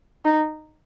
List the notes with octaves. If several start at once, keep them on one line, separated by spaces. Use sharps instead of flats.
D#4